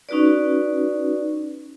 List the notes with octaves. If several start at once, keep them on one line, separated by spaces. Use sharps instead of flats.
C#4 D#4 F#4 B4 D5